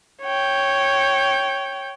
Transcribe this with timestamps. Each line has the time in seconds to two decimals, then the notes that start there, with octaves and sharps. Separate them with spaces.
0.22 C#5 G5